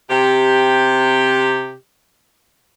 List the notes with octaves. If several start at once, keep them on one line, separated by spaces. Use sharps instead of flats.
C3 G4